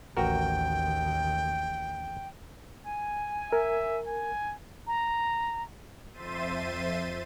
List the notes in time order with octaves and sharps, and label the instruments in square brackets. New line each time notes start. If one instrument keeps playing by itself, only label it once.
[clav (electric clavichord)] A1 F#4 A#4 [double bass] D#2 [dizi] G5
[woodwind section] G#5
[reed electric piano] A#4 [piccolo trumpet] E5
[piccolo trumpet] G#5
[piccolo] A#5
[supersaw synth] F2 C5 E5 C6 A6 D#7